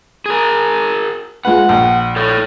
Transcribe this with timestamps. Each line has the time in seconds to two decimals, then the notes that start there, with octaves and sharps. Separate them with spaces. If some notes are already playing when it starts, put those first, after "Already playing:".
0.26 G#4 A#4
1.45 G#3 F4 B4 F#5
1.69 A#1
2.16 A4 C#5